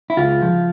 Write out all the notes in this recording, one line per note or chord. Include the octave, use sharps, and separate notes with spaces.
E4
C#2 F4
F3